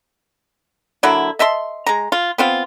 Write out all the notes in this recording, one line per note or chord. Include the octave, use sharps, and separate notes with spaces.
D3 F#3 A#3 E4
D#5 E5 A5 C6
G#3 A#5
F4
B3 C4 F4